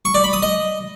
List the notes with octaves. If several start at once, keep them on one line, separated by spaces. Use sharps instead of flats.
C#6
D5
B5
D#6
D#5